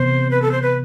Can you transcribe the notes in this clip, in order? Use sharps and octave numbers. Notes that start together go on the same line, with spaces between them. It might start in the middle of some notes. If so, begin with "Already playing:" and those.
Already playing: C3 E3 B3 C5
B4
A4
C5
B4